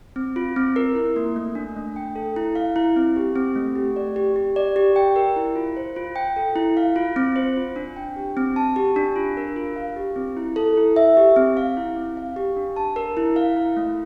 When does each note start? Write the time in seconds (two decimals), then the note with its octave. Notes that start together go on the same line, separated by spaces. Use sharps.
0.16 C4
0.36 F4
0.56 C4
0.76 A#4
0.95 E4
1.16 A#3
1.36 A3
1.55 D4
1.76 A3
1.96 G5
2.16 A4
2.36 E4
2.55 F5
2.76 E4
2.96 C4
3.16 G4
3.36 C4
3.55 A3
3.75 G4
3.96 D5
4.16 G4
4.36 G4
4.56 D5
4.76 G4
4.96 G5
5.16 A#4
5.36 E4
5.56 F4
5.77 C5
5.96 F4
6.16 G5
6.36 A4
6.56 E4
6.77 F5
6.96 F4
7.16 C4
7.36 C5
7.57 F4
7.76 D4
7.96 G5
8.16 G4
8.37 C4
8.56 A5
8.76 G4
8.96 D4
9.16 F4
9.37 A#4
9.56 F4
9.76 F5
9.97 G4
10.16 C4
10.37 E4
10.56 A4
10.77 E4
10.96 E5
11.17 G4
11.36 C4
11.57 F5
11.77 E4
11.96 C4
12.17 F5
12.36 G4
12.56 D4
12.76 A5
12.96 A#4
13.17 E4
13.36 F5
13.56 E4
13.77 A3